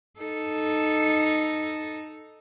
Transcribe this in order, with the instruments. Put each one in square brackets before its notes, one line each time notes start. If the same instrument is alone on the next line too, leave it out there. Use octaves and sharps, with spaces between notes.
[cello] D#4 A4